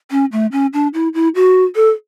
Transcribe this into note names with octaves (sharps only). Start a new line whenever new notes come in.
C#4
A3
C#4
D4
E4
E4
F#4
A4